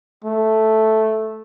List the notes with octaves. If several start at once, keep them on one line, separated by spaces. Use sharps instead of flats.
A3